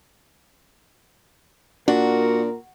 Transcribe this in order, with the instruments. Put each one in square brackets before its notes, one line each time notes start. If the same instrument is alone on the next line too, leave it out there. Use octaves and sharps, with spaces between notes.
[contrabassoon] A#2 [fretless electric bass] D4 [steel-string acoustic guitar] F#4 [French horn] A#4